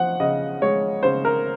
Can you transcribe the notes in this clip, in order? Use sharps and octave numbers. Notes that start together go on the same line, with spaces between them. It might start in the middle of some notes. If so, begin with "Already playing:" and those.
Already playing: F3 F#5
C#3 D#5
G#3 C#5
C#3 C5
A#4